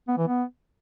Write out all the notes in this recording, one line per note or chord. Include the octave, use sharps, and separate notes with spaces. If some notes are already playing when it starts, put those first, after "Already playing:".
B3
E3
B3